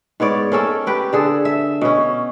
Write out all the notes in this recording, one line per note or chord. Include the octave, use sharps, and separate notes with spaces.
G#2 B3 C#5 D5
A#3 C#4 A4
G4 B4 G5
D3 G#4 A4
E5
B2 C#4